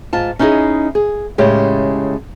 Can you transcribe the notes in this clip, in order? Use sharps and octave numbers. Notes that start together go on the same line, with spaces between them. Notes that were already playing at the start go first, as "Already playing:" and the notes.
G#2 F4 A5
C#4 D#4 E4 F#4 G#4 D#5
G#4
A2 C#3 G#3 C#4 G4